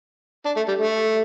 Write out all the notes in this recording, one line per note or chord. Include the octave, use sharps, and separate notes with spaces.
D4
A3
G3
A3